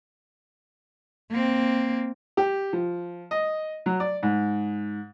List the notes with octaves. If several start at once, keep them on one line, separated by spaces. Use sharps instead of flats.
A#3 C4
G4
F3
D#5
F#3
D5
G#2